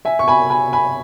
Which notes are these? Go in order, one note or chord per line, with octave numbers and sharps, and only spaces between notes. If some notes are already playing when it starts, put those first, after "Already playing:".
E5 G#5
C#6
G#5 B5
G#5 B5
G#5 B5